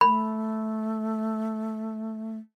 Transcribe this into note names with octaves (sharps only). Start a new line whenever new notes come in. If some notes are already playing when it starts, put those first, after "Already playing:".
A3 B5